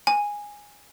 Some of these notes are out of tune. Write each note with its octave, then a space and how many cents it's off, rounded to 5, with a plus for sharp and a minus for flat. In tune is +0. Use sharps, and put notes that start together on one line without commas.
G#5 -10